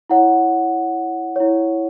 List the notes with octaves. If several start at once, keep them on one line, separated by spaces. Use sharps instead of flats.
E4 C#5 F#5
E4 C#5